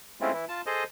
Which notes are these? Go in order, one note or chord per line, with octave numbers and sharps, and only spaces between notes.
G#3 A3 C4 C#4 E4 F4
E3 E4
F4 A5
G#4 A4 C5 D#5